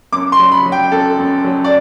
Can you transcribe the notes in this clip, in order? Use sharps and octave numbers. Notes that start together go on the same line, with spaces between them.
F#2 D6
C6
F#3
B5
F#3
G5
F#2 A4
F#2
F#3
D5